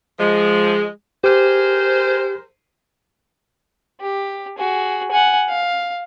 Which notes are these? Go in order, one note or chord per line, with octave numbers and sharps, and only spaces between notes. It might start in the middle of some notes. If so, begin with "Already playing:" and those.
F3 G#3
G4 G#4 A#4 C5
G4
F#4 G#4
F#5 G#5
F5